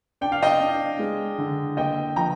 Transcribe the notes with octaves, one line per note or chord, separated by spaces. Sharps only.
D4 G5
F5
D#5 G5
D4
G#3
D3
A#3 D#5 G5
F3 G5 A#5